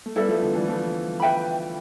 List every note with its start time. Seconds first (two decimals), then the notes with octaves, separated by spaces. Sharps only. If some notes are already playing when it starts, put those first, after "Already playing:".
0.06 A3
0.16 G3 B3 E4 A4 E5
0.29 F3 A3
0.42 D3 F3
0.55 E3 G3
0.68 F3 A3
1.20 B4 E5 G5 B5